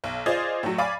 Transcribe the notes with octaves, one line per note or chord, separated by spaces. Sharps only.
B1
F4 G#4 C5 D5 D#5
A2 F#3
D5 F5 G#5 B5 D6